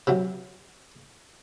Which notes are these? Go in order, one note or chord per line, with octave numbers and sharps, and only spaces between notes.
C3 E3 F#3